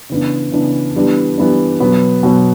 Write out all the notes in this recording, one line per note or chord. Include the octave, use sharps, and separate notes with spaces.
C#3 E3 B3 D4
C#3 E3 B3 D4
E3 G3 B3 D4
E3 G3 B3 D4
B2 F#3 B3
B2 F#3 B3